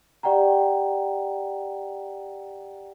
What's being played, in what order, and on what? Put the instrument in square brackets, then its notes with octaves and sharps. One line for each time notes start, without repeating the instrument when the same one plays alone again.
[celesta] G4 D5 F#5 G5 A#5